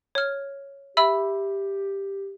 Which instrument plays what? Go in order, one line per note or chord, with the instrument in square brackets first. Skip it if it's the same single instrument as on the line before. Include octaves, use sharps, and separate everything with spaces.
[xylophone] C#5 F6
[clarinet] G4 [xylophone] E5 B5 E6